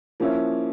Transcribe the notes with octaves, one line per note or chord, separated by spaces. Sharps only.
F3 A#3 C#4 E4